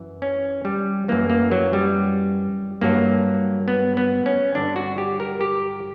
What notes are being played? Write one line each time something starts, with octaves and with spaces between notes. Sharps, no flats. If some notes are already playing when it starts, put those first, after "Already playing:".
Already playing: F#2 E3
C#4
G3
F#2 E3 A#3
A#3
F#3
G3
G2 F#3 A#3
B3
B3
C#4
G2 D3 F#3 D4
F#4
G4
A#4
G4